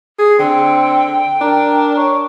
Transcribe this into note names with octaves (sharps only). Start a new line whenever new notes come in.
G#4
D3 C4 G5
D4 A#4
C#5